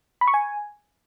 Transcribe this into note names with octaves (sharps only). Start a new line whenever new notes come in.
B5
C#6
G#5